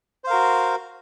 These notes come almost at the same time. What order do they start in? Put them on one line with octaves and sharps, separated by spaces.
C5 F5 A#4 F#4